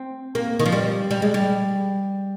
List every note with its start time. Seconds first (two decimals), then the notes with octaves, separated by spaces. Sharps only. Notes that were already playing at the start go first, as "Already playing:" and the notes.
Already playing: C4
0.35 A#3
0.59 D#3
0.65 F3
0.72 G3
1.11 G3
1.22 G#3
1.34 G3